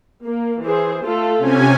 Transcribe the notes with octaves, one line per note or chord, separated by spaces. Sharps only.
A#3
E3 G#4 C5
A3 F4 A4
C3 C#4 G#5